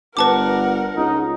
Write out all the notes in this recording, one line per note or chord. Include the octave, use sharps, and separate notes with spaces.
G1 A#4 B4 F#5 A5 D6
C#2 D#4